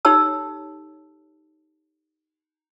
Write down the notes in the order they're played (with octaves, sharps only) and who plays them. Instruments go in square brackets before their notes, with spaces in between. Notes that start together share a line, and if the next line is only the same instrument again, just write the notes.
[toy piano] D#4 G4 A4 C#5 A5 E6